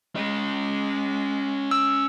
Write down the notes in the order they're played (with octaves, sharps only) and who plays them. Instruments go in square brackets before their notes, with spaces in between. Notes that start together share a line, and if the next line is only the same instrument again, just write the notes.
[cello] G#3 [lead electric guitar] C#4 D#5
[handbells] E6